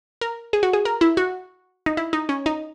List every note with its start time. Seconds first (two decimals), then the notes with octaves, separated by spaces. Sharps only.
0.21 A#4
0.53 G#4
0.63 F#4
0.73 G#4
0.85 A#4
1.01 E4
1.17 F#4
1.86 D#4
1.97 E4
2.13 D#4
2.29 C#4
2.46 D#4